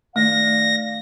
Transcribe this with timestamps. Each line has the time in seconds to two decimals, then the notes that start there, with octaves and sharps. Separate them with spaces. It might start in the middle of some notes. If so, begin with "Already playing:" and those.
0.16 D#3 A3 D5 F5 A#6